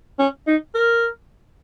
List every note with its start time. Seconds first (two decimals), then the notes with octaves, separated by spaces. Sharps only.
0.19 C#4
0.47 D#4
0.75 A#4